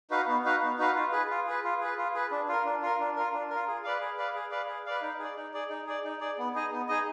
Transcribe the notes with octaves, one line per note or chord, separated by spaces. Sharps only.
D#4 F#4 B4 F5
B3
D#4 F#4 B4 F5
B3
D#4 F#4 B4 F5
F4
G#4 B4
F4
G#4 B4
F4
G#4 B4
F4
G#4 B4
D4
F4 A#4
D4
F4 A#4
D4
F4 A#4
D4
F4 A#4
G#4
B4 D5 F5
G#4
B4 D5 F5
G#4
B4 D5 F5
G#4
B4 D5 F5
D#4
G#4 D5
D#4
G#4 D5
D#4
G#4 D5
D#4
G#4 D5
B3
D#4 G#4 D#5
B3
D#4 G#4 D#5